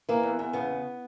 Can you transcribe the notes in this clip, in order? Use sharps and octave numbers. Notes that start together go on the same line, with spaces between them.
E3 A#3
E2
E2
C#3 B3